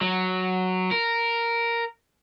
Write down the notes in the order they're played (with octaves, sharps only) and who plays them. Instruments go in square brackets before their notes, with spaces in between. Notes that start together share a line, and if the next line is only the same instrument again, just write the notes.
[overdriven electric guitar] F#3
A#4